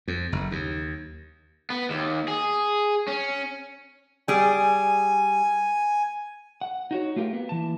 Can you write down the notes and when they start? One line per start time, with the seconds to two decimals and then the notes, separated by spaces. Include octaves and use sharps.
0.08 F2
0.32 F#1
0.51 D#2
1.70 B3
1.90 D#2
2.28 G#4
3.08 C#4
4.28 G3 G#4 G#5
6.61 F#5
6.91 D#4 F#4 C#5
7.16 A3 F4 G4 A#4
7.33 A#3 B3
7.49 E3 A5